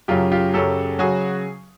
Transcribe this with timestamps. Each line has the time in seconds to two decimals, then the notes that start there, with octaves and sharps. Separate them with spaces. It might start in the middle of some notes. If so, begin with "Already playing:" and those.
0.08 F#2 C#3 F#3 F4 G4
0.32 F4 G4
0.54 F#2 C#3 F#3 G4 A4
0.99 C#3 F#3 F#4 G#4